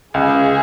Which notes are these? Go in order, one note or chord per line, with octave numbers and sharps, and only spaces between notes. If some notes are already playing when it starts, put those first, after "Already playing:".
C#2 G#4